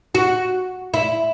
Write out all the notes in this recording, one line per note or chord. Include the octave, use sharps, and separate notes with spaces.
F#4
E4